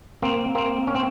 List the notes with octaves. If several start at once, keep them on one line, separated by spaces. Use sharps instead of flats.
A#3 C4
A#3 C4
C#4
C4